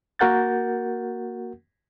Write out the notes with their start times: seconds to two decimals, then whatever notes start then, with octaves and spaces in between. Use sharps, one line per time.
0.19 A#3 F#4 A#4 F#5 G6 A6